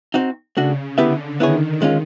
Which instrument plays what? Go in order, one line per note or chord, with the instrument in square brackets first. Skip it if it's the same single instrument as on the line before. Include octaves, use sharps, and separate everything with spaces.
[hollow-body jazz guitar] C4 D#4 F#4
[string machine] C#3 [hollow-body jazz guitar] A3 D4 F#4
[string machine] D3 [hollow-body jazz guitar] B3 E4 G4 B4 E5
[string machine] D#3 [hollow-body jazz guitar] B3 E4 G#4 C#5
[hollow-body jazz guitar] G#3 C#4 F4